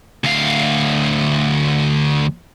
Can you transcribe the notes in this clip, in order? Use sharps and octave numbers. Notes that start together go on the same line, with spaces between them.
D2 F5